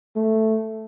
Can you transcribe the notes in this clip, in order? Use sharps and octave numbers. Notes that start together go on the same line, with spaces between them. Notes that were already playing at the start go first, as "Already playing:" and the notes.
A3